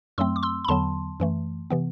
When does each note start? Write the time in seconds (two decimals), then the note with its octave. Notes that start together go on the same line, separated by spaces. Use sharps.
0.18 F#2 F#3 A3 C4 C6 E6
0.36 D6
0.43 C6 E6
0.64 B5
0.68 E2 D3 F#3 B3 A5 C6
1.20 F#2 E3 A3
1.70 C3 E3 B3